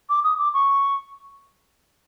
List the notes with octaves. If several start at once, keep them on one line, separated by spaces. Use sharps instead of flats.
D6
D#6
D6
C#6